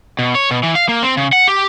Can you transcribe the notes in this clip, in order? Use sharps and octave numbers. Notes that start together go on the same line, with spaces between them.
B2
C#5
B2
E3
F5
A#3
C4
C#3
F#5
G4